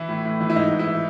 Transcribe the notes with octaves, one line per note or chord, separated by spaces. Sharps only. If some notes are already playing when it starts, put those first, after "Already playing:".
Already playing: E3 E4
A2
A2
E3
E4
G#2 D#4
G#2
E4
E3